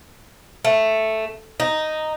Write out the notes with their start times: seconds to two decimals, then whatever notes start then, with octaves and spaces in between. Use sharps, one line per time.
0.65 A3
1.60 D#4